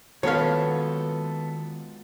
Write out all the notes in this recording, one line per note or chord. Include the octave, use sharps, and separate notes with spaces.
D#3 G#3 B3 F4 F#4 A4 C#5 F5